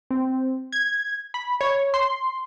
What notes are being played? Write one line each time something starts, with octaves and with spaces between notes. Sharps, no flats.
C4
G#6
B5
C#5
C6